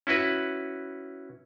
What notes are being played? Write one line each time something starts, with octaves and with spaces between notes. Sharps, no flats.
C#4 E4 F#4 B4